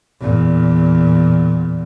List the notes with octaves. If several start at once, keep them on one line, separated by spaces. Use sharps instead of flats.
E2 A#2